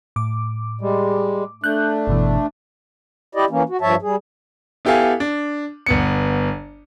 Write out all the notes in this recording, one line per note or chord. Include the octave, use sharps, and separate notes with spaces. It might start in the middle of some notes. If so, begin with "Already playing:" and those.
A2 D6
G3 G#3
A3 D4 F#6 G6
G1 B2 E3
E4 G4 D5 D#5
E3 A#3 C#4
F#4
G2 F3 C#5 E5 A5
G3 G#4
B3 E4 G4 A4 F5 G#5
D4
G1 B3 C#7